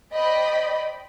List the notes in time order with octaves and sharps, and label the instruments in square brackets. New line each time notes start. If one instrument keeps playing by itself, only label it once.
[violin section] C5 D5 D#5 G5 B5